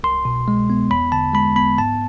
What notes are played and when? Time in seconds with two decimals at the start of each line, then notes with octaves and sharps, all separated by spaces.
0.04 C2 C6
0.25 B2
0.48 G#3
0.70 B3
0.90 E2 B5
1.12 D3 A5
1.34 G#3 B5
1.55 B3 B5
1.78 G#2 A5